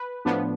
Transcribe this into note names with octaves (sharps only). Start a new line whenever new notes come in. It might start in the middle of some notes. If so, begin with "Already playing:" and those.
Already playing: B4
A2 F3 B3 D4